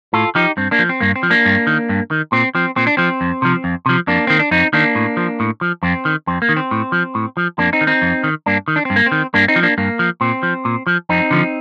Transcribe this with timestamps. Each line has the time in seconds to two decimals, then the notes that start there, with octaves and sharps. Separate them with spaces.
0.13 A2 F4 A4
0.35 F3 D#4 G4
0.57 G2 C4
0.71 A#3 D4
0.79 F3
0.89 C4
1.01 G2 A#3
1.16 C4
1.23 F3
1.30 A#3 D4
1.46 G2
1.67 D#3
1.89 G2
2.11 D#3
2.32 A#2 C4
2.55 F3 C4
2.76 A#2 C4
2.87 D4
2.97 F3 C4
3.21 F2
3.42 C3 F3
3.64 F2
3.86 C3 F3
4.07 F2 A#3 D4
4.27 D#3 C4
4.39 D4
4.51 F2 C4 D#4
4.73 D#3 A#3 D4
4.95 A2
5.17 F3
5.40 A2
5.61 F3
5.83 F2 C4
6.05 D#3
6.27 F2 C4
6.42 A#3
6.49 D#3
6.56 C4
6.71 A2
6.92 F3
7.15 A2
7.37 F3
7.58 F2 A#3 D4
7.73 C4 D#4
7.81 D#3
7.87 C4 D#4
8.02 F2
8.24 D#3
8.46 G2 A#3 D4
8.68 D#3
8.76 D4
8.85 G2 C4
8.96 A#3
9.06 C4
9.12 D#3
9.34 G2 A#3 D4
9.48 C4 D#4
9.56 F3
9.63 A#3 D4
9.78 G2 A#3
9.99 F3
10.21 A#2 C4
10.43 F3
10.65 A#2
10.87 F3
11.09 F2 C4 D#4
11.31 D3 F3